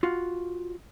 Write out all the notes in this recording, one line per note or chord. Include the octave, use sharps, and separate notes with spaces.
F4 F#4 F5